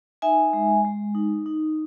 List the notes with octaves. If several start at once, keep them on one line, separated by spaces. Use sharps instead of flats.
D#4 E5 G#5
G#3
G#3
D#4
D#4